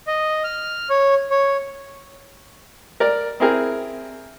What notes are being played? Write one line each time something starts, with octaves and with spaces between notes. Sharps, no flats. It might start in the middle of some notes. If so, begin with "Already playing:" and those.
D#5
F6
C#5
C#5
A#4 D5
C4 E4 G#4 A#4